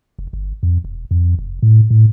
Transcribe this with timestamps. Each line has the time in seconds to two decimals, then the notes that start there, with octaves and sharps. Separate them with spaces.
0.19 F1
0.33 G1
0.63 F2
0.84 E1
1.11 F2
1.38 F1
1.63 A2
1.90 A2